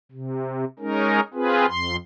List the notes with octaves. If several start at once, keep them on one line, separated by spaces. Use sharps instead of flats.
C3
G#3 C#4 D#4 A#4
C4 F4 G#4 B4
F2 C6